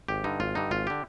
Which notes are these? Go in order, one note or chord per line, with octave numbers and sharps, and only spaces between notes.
G#1 G4
G2 D3 D#4
G#1 F4
G2 D3 D#4
G#1 F4
D3 G4